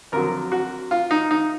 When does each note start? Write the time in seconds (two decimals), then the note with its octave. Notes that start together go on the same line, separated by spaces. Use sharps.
0.12 F2 D3 F#3 A#4
0.52 F#4
0.91 F4
1.11 D#4
1.31 D#4